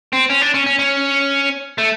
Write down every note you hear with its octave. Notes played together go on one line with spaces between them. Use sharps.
C4
C#4
D4
C#4
C#4
C#4
A3